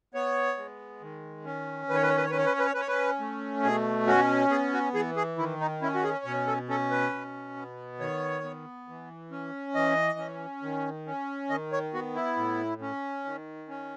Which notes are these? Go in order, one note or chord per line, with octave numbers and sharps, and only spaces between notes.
B3 C#5
G#3
D#3
C#4
D#3 B4
C#5
B4
C#5
B4
C#5
C#4 B4
C#5
B4
C#5
B4
C#5
C#4 B4
C#5
B4
A3
B2 G#4
C#4 F#4
B3 G#4
F#4
E3 G#4
G#4
D#3 E4
D#4
C#4 E4
F#4
G#4
B2 C#5
A4
C#4 A4
B4
B2
B3
D#3 C#5
B3
E3
C#4
E3 D#5
C#4
D#3
C#4
D#3 D#5
C#5
B3 F#4
E4
A2
C#4
D#3
C#4